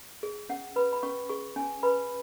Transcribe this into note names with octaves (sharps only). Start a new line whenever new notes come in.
G#4
C#4 F#5
B4 B5
B5
C#4 C#6
G#4 C#6
C#4 G#5
B4 B5